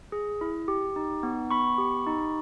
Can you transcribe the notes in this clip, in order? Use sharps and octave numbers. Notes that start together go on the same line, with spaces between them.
G#4
E4
G4
D#4
B3
B3 B5 C#6
G4
D#4